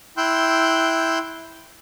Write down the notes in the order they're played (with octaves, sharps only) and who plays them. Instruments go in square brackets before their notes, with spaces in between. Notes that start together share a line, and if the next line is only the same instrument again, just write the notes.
[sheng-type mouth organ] E4 G5 C6 E6 F#6 G6